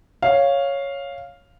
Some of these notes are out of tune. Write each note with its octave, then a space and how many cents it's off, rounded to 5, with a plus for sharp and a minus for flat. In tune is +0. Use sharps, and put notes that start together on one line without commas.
C#5 +0 F5 +0